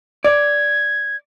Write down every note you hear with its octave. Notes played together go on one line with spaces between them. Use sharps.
D5 G#6